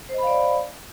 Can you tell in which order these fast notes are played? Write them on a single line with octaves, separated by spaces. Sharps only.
C5 D#5 B5 F5 D5